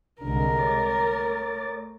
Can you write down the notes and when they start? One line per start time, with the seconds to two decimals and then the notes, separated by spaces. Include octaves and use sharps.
0.21 C2 D3 G#3 D4 A#4
0.59 C#5 D6 A6
0.97 A3